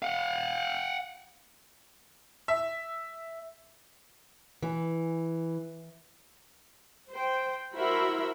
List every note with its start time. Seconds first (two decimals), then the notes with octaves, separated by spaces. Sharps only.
0.02 F5 F#5
2.48 E5
4.62 E3
7.10 C5 G5
7.73 E4 F#4 A#4 C5 E5 B5